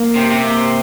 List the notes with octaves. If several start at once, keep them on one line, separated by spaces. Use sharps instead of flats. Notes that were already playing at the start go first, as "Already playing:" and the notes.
Already playing: A#3
C3
C3
A#3